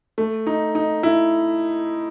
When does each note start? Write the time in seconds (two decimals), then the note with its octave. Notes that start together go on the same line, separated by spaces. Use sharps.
0.18 A3
0.47 D#4
0.75 D#4
1.03 E4